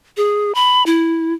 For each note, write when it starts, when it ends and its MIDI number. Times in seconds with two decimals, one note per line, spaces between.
0.17 0.52 68
0.55 0.83 83
0.86 1.34 64